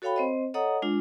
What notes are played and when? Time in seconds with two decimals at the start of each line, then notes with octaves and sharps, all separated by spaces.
0.02 F#4 A4 C#5 F5 G5 B5
0.16 C4 C5 D#5
0.54 A4 C#5 D#5 F#5 A#5 D#6
0.82 G#3 D4 F4